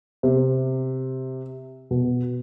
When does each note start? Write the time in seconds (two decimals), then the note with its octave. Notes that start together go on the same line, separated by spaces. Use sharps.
0.23 C3
1.91 B2